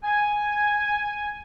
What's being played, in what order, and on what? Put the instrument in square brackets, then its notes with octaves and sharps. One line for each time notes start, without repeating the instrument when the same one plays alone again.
[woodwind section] G#5